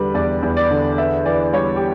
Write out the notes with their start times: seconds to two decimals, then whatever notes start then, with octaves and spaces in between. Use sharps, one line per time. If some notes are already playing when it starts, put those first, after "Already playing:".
Already playing: E2 D3 G3 B4
0.14 E2 D5
0.42 E2
0.57 D5
0.70 D3
0.98 B3 E5
1.26 E3 D5
1.53 G3 C#5
1.76 G4